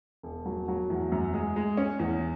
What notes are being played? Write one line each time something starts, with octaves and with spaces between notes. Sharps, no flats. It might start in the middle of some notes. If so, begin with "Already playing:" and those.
E1
F#3
F#3
E2
F#2
G#3
G#3
C#4
E2